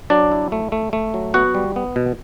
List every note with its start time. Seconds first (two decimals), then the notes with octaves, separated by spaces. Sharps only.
0.10 F#3 D4 D5
0.32 E4
0.52 A3
0.72 A3
0.93 A3
1.14 F#3
1.34 B3 F#4 F#5
1.55 G3
1.76 B3
1.96 B2